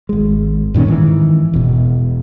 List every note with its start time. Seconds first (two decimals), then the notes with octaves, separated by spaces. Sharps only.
0.09 G#1 G#3
0.74 G2 A#2 D#3 C#4
0.88 G#2 D#3 E3
1.54 E1 B2